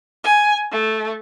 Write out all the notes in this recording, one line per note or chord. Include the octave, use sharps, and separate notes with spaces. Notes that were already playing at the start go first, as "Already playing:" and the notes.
G#5
A3